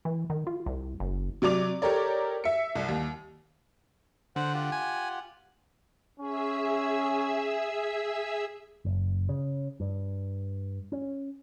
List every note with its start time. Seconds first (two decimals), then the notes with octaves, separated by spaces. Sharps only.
0.05 E3
0.30 D#3
0.47 F4
0.66 C2
1.00 F#1
1.42 C3 F#3 D5 D6 F7
1.82 G4 A4 A#4 C#5 D5
2.44 E5 C#7
2.75 C2
2.88 D#2
4.36 D3 C5 F#5
4.54 F4 G4 F#5
4.72 G#5
6.20 C#4 G#4 E5 E6
8.85 F#1
9.29 C#3
9.80 G2
10.92 C#4